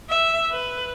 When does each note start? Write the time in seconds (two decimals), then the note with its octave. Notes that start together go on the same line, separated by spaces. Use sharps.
0.10 E5
0.51 B4